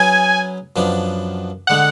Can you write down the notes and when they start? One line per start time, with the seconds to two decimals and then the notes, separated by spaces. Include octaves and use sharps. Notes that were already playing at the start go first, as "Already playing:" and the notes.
Already playing: F#3 C#4 G#4 B4 G#5
0.76 F#2 F3 B3 D4
1.67 D3 G#3 F#5